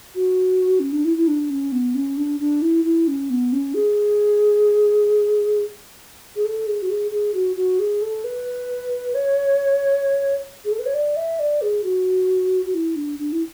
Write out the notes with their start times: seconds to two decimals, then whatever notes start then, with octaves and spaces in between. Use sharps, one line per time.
0.15 F#4
0.80 C#4
0.92 D4
1.05 E4
1.17 E4
1.28 D4
1.50 C#4
1.72 B3
1.95 C#4
2.17 D4
2.40 D4
2.62 E4
2.85 E4
3.08 C#4
3.30 B3
3.53 C#4
3.74 G#4
6.36 G#4
6.45 A4
6.67 G#4
6.82 F#4
6.90 G#4
7.11 G#4
7.34 F#4
7.56 F#4
7.79 G#4
8.02 A4
8.24 B4
9.15 C#5
10.65 G#4
10.72 A4
10.79 B4
10.86 C#5
10.94 D5
11.16 E5
11.39 D5
11.62 G#4
11.84 F#4
12.66 F#4
12.74 E4
12.96 D4
13.19 D4
13.32 E4